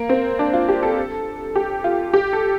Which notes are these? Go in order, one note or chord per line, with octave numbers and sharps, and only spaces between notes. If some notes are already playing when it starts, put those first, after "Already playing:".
Already playing: A#3
C4
D4
F4
G4
A4
G4
F4
G4
A4